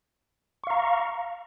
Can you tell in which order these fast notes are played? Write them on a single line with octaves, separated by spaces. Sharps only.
C#6 F5 A#5